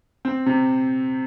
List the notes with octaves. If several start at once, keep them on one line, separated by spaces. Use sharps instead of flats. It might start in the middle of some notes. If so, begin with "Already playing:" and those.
C4
C3